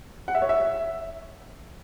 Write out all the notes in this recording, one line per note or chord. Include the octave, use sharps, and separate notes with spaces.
F#5
E5
C#5
E5